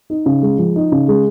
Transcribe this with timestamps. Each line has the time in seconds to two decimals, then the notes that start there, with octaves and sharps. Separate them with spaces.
0.10 D#4
0.26 C#3
0.42 G#3
0.58 F3
0.76 D#4
0.92 C#3
1.08 G#3